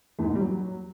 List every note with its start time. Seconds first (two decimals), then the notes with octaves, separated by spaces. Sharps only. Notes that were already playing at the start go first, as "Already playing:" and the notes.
0.19 E2
0.24 G#2
0.30 A#2
0.35 G3
0.41 F#3